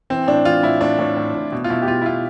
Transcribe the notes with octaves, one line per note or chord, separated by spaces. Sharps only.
E3 C4
A2 D4
E3 F4
A2 E4
A2 D4
A2
A2
A2
B2
F4
B2 E4
G4
B2 F4
E4
B2 F4